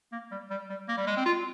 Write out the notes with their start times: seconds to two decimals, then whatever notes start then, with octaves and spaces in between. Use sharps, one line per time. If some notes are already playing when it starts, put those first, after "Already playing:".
0.12 A#3
0.31 G3
0.50 G3
0.69 G3
0.88 A#3
0.97 G3
1.07 G#3
1.17 C4
1.26 F4